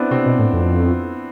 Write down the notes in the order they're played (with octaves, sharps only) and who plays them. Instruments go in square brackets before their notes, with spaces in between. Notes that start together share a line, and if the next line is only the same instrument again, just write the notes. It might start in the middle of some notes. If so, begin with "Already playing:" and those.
Already playing: [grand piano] B3 C4 D4 E4
[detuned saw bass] C3 [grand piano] C4
[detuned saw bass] B2
A2
F2